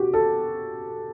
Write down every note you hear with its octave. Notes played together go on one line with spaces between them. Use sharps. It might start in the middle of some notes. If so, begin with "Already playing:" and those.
Already playing: F#4 G4
A4